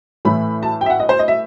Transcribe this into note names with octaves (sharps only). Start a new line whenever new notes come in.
A2 E3 A3 B5
A5
G5
E5
F#5
D#5
C5
D#5
E5